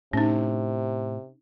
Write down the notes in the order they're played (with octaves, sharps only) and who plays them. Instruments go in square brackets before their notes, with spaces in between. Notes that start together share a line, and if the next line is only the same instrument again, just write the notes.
[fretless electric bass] A2 [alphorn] C3 [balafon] C#4 D#4